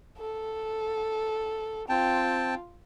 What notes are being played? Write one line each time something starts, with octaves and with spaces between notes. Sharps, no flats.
A4
C4 F4 G5 A5